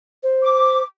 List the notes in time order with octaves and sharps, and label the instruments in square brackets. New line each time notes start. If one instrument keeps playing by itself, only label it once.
[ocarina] C5
[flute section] D6